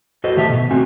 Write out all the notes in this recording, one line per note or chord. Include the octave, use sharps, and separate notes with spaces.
F#4 A4 B4 C5 D#5
A2 D#3 G4 E5 A5
B2
A3 C4 F#4 G#5